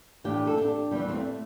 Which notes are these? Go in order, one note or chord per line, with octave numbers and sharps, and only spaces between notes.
A2 E3 D4 G4
A4
D4 G4
E2 E3 G3
C4
A3